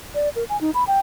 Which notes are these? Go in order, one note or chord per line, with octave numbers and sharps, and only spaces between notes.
D5
A#4
G#5
D#4
B5
G5